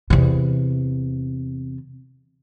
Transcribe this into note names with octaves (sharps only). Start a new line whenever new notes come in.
E2 C3